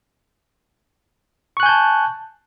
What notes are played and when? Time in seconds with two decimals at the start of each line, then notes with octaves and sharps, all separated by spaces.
1.57 C#6
1.60 F#6
1.63 G#5
1.66 G6
1.69 A5